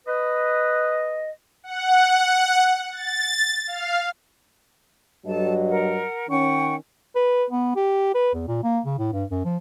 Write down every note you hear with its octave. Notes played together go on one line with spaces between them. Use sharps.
B4 D#5
F#5
A6
F5
G2 F#3 A4 D#5 A5
A#4 F#5
D#3 C#4 F#5 G5 C#6
B4
B3
G4
B4
E2
A#2
A#3
C#3
A2
G2
F#2
F3